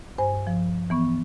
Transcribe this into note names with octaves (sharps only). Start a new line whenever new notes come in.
G2 C5 G#5
F3
E3 B3 C#6